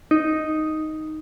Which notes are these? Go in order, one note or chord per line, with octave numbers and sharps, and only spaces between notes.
D#4